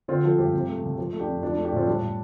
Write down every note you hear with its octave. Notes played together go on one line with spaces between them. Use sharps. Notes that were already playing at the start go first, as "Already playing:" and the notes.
D3 C4 F4
F3 F4 A4
G2 G4 C5
C3
A3
C2
F3
A3
D4 G4
F2
F3 D4
D4
A3
D4 G4
A2 C4 F4
G3 D4
A2